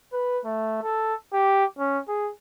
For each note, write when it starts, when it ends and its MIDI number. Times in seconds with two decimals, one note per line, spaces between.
0.13 0.39 71
0.45 0.80 57
0.82 1.14 69
1.33 1.65 67
1.79 1.99 61
2.08 2.30 68